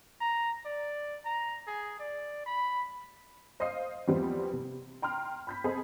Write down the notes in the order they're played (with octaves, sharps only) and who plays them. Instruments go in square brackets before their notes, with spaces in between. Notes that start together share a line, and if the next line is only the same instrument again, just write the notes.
[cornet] A#5
D5
A#5
G#4
D5
B5
[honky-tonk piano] C5 D#5 F5 D#6 C7
E2 F3 G3 B3 C4
C3
G5 A#5 C6 F6
B5 G6 B6
C4 G#4 A4 D#5 B5